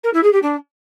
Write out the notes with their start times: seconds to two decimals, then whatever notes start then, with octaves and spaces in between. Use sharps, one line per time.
0.03 A#4
0.13 E4
0.23 G#4
0.33 G4
0.42 D4